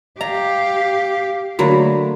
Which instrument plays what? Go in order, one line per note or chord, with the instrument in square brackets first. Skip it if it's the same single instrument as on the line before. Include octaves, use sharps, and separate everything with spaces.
[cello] G4 F5 [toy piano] D#5 [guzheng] A#5
[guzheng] D3 F#3 A#3 [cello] A3 [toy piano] F#4 G#4 B5